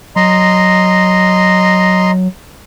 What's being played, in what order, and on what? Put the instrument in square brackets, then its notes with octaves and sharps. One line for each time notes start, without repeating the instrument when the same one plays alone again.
[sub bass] F#3 [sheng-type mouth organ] D#5 A#5 C6